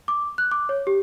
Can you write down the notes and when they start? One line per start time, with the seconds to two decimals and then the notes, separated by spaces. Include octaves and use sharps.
0.08 D6
0.38 F#6
0.51 D6
0.69 C#5
0.87 G4